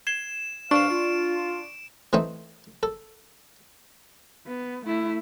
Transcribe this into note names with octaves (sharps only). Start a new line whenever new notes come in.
G#6 C7 E7 G7
G2 D4 C5 F5 C#6 D7 E7
F4
E3 A3 C4 D#4
A4
B3
A3 E4